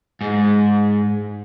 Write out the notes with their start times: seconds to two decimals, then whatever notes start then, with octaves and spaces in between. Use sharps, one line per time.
0.21 G#2